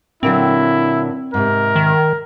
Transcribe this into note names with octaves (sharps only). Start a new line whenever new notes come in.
A#2 D3 F#3 C4 E4
G#2 C3 A#4
D#3